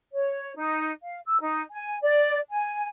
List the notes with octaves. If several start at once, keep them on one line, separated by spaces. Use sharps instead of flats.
C#5
D#4
F5
E6
D#4
G#5
D5
G#5